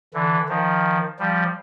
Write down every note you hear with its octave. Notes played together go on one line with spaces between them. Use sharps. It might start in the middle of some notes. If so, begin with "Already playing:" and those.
D3 E3
D#3 F3
F3 G3